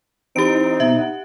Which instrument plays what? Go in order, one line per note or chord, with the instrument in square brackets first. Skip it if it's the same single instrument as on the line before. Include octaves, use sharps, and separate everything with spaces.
[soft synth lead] E3 [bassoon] C4 [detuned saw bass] D#4 [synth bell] G4 D7
[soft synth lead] B2 [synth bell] E5
[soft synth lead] F#5